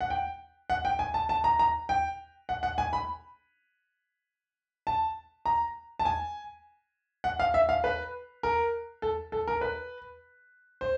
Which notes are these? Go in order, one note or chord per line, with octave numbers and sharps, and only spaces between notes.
F#5
G5
F#5
G5
G#5
A5
A5
A#5
A#5
G5
F#5
F#5
G#5
B5
A5
A#5
A5
G#5
F#5
F5
E5
F5
B4
A#4
A4
A4
A#4
B4
C5